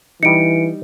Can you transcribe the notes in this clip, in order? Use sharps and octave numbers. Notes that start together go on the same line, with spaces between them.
E3 G3 D#4 C#7 D7